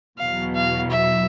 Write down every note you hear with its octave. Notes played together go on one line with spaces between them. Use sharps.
E2 B2 F#3 F5
F5
E5